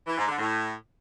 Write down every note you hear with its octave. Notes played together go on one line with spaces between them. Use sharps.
E3
G#2
D3
A2